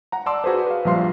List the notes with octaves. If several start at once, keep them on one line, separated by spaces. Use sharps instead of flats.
F#5 A#5
D5 A5 C6 D6 E6
F#4 G#4 B4 C5
B4 F5
A#1 F3 G3 F5 C6 C7